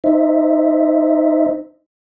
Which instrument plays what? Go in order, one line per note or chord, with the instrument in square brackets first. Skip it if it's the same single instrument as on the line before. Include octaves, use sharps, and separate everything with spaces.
[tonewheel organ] D#4 C5 D#5 E5